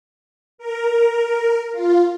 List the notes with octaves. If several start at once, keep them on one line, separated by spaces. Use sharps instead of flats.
A#4
F4